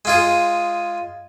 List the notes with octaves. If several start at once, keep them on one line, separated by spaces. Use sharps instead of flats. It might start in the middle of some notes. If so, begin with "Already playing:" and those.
G#3 F4 G#4